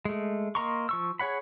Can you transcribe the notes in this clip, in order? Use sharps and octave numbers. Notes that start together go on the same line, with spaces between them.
G#3 A3
A#3 D#5 A#5 C6 C#6
F3 C#6 E6
G#4 C#5 F#5 B5